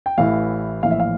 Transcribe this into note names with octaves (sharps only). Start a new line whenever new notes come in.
G5
A1 A2 E3 F5
A#1 A2 E3 F5
E5
F5